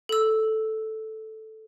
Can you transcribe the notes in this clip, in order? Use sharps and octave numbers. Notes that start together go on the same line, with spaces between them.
A4 E6